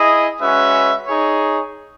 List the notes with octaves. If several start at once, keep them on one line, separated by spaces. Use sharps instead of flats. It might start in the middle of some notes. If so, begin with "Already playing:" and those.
Already playing: E4 G#4 D#5
G#3 C#4 F#4 B4 E5
D#4 G#4 C#5